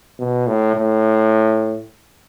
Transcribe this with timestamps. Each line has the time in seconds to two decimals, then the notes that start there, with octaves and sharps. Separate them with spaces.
0.19 B2
0.47 A2
0.75 A2